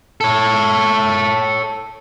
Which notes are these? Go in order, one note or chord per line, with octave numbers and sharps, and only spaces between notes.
A4 C#5